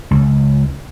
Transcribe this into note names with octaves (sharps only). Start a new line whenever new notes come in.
C#2